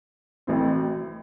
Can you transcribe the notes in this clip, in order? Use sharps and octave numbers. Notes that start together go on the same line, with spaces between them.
A1 A2 F#3 C4